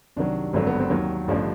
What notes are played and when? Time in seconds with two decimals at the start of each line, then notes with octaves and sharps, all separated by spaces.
0.16 C2 C3 D#3 F#3 D4
0.53 G#1 G2 D3 F#3 C4
0.67 B3
0.79 C4
0.90 D#2 D#3 F#3
1.28 A1 G2 D3 F3 C#4
1.36 D4